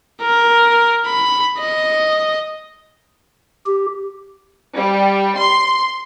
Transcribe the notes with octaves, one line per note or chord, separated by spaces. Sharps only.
A#4
B5
D#5
G4
G3
C6